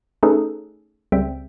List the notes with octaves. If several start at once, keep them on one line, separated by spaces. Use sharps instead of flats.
A3 C#4 D#4 G#4 A4 B4
C#2 C#3 G3 C4 E5 G5